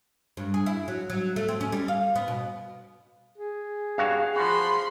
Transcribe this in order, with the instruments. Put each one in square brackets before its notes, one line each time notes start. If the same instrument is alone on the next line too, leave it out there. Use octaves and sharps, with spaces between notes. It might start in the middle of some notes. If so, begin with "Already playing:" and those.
[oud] G2
G#4
E4
F#3
F#3
A3
C4
C#4
G3
F5
B3
B2
[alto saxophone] G#4
[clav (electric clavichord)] G2 F#4 C#5 [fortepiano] F5
[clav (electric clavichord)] F3 F#4 [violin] B5 C6